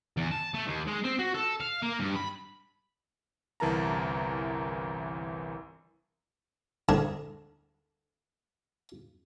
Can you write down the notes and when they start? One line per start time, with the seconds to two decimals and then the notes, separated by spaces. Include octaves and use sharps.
0.17 E2
0.31 A5
0.54 A3
0.67 D#2
0.87 G#3
1.04 C4
1.19 F#4
1.34 A4
1.61 F5
1.82 A#3
2.00 G2
2.16 B5
3.60 G1 C2 E3 A#4 A5 A#5
6.89 D2 D3 G#4 A5 A#5